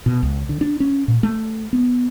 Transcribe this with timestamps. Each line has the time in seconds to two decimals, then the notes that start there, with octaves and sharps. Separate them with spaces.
0.06 B2
0.23 C#2
0.49 D3
0.61 D4
0.80 C#4
1.08 A#2
1.23 A3
1.73 B3